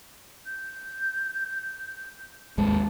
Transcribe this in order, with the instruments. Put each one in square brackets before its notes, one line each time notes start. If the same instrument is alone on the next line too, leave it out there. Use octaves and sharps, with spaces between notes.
[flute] G6
[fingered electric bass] G#1 D#2 G#3 [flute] A5